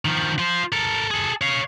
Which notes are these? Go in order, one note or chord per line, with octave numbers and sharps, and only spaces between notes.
D#3 F3
F4 C5
A4 A#4
G#4 A4
C#5 F5